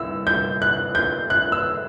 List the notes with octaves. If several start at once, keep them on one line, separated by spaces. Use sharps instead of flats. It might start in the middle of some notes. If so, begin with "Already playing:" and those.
Already playing: C2 E6
G6
F#6
G6
F#6
E6